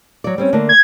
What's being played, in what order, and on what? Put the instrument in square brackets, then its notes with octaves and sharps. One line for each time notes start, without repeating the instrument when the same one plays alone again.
[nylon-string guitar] F#3 D5
G3 C4 C#4
D3 A3 A#3
[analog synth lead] G#6